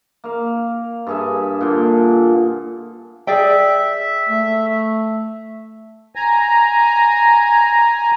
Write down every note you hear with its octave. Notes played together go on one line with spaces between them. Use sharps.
A#3 F5
G2 G#4 E5
A#2 D3
G#4 D5 E5 G5
A3
G#5 A#5